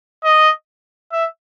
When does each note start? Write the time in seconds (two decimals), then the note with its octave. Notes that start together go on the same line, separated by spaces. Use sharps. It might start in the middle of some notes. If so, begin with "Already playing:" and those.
0.24 D#5
1.12 E5